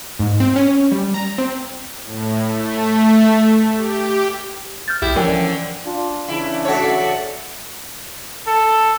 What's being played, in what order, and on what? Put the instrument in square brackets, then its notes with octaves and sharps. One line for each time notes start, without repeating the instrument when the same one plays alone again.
[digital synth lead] G#2
C4
C#4
G3
A#5
C4
[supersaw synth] A2
A3
G4
[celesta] F6 G6 A6
[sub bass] B1 [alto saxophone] E4 [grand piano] G4
[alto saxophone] D3 [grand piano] E3 C#4 [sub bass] F3 [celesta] A#4 D5 G5
[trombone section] D4 F4
[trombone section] C#3 E3 D4 [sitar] E4
[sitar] F#4 C#5 [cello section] A4 D5 E5
[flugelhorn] A4